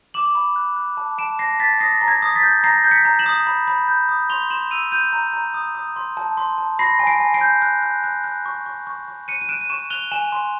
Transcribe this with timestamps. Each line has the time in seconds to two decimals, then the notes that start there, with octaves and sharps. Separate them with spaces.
0.14 D6 E7 F#7
0.35 B5
0.56 F#6
0.76 F#6
0.97 A5
1.18 A5 D7 E7
1.39 A5 A#6 C7
1.60 A5 A6 B6
1.80 D#6 A#6 C7
2.01 A#5
2.08 G#6 A#6
2.22 D#6
2.36 A6 B6
2.43 G6
2.63 A#5 A#6 C7
2.84 G6
2.91 B6 C#7
3.05 A#5
3.19 E7 F#7
3.26 D#6
3.47 B5
3.67 B5
3.88 G6
4.09 D#6
4.30 C6 F7 G7
4.50 C6 E7 F#7
4.71 E6 D#7 F7
4.92 G6 D#7 F7
5.13 A#5
5.33 A#5
5.54 D#6
5.75 D#6
5.96 C6
6.17 A5
6.37 C6
6.58 A5
6.79 B5 A#6 C7
6.99 G#5
7.07 C7 D7
7.20 G#5
7.34 C7 D7
7.41 G6
7.62 F#6
7.83 F#6
8.04 F#6
8.24 F#6
8.46 C#6
8.66 C#6
8.87 C#6
9.08 C#6
9.28 F#6 C#7 D#7
9.41 D#7
9.49 F#6 D7 E7
9.61 D#7
9.70 C#6 D7 E7
9.90 F#6 F7 G7
10.12 G#5 E7 F#7
10.32 C6